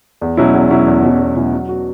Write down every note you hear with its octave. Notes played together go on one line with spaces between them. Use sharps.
E2
B2 F#3 C#4 E4
E2
B2 F#3 C#4 E4
E2
B2 F#3 C#4 E4
E2
B2 F#3 C#4 E4
F#3
B3 F#4